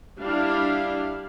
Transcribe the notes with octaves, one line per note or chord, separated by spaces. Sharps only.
G3 D4 E4 F5